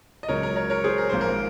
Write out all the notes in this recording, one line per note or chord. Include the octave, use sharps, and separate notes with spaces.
D#5
C#2 C#3 F#3 A#4 C#5
A#4
A#4 C#5
A#4 C#5
G#4 C5
A#4
G#1 G#2 F3 A#3 C5
A#4